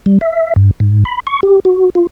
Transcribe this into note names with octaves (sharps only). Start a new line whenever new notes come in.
G3
E5
G2
G#2
B5
C#6
G4
F#4
F4